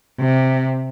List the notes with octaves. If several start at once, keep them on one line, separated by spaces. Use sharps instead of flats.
C3